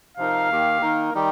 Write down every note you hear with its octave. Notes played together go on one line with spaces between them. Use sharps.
C3 F3 D#4 A#4 F5
D#2 D#3 A#3 G4
D#3 A#3 D#4 A#4
D#3 G3 D#4 G4